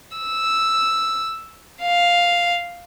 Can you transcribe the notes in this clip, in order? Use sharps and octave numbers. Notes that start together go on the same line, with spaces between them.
E6
F5